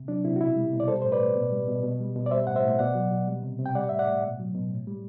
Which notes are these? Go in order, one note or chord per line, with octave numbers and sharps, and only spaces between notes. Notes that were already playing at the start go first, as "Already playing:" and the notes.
Already playing: C3
F#3 D4
C3 E4
F#4
B2 E4
G3
B2
D5
G3 A4 C5
A2 C5
B4 D5
A2
B2
G3
B2
B2
G3
B2
D5
G3 C5 E5
A2 F#5
C5 E5
A2
B2 D5 F#5
F#3
B2
G3
C3
C3
G5
G3 D5 F#5
A2 E5
D5 F#5
A2
B2
F#3
B2
A2
G3